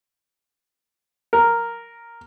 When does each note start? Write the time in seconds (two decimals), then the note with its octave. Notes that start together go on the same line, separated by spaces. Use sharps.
1.33 A#4